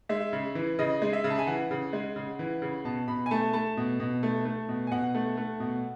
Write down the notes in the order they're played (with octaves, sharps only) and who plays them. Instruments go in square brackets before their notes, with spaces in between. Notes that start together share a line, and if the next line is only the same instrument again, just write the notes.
[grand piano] G#3 E5
C#3
E3
C#3 D#5
G#3
E5
C#3
A5
G#5
E3 F#5
C#3
G#3
C#3
E3
C#3
B2 A5
B2 B5
G#5
A3 A5
A3 A5
B2
B2
A3
A3
B2
G#5
B2 F#5
A3
A3
B2